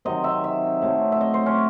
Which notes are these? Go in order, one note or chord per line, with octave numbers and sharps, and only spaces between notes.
C3 D#3 F#3 C4 D#5
E5
E5
A2 F#3 A3 C4
E5
D#5
C5
C#4